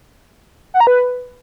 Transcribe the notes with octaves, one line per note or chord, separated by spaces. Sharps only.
F#5
A#5
B4